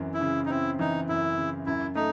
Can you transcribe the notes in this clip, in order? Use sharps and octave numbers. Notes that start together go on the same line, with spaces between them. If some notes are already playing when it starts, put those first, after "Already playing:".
Already playing: F#2 E3 C4
E4
C#3
D#4
C4 E4
E3 D#4
F#2 E4
C#3
F#2 E4
A3 D#4